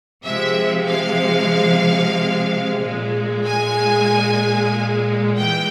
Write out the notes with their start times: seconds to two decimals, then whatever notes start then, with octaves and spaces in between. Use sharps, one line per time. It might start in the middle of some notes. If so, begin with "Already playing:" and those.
0.24 C3 F3 G#3 E5
0.88 F5
2.81 A#2 G#3
3.45 G#5
5.37 E3 G#3 G5